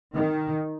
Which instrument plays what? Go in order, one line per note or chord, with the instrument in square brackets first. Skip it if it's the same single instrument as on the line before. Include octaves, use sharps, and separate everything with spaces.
[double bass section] D#3